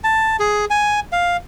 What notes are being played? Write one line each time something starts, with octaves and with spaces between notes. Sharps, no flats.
A5
G#4
G#5
F5